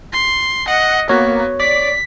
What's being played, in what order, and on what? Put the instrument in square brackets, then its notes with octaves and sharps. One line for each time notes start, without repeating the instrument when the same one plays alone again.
[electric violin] C6
[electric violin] D#5 [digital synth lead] F#5
[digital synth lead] A#3 [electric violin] B3 F#4 [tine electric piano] C#5
[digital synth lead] D5 [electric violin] B6